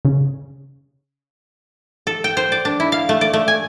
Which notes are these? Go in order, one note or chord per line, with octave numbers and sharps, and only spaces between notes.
C#3
A4
G5
C5
D5
D4
E4
F5
A3
D5
A3
G#5